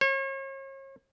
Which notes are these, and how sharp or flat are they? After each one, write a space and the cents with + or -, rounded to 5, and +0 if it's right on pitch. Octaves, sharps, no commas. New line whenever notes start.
C#5 -40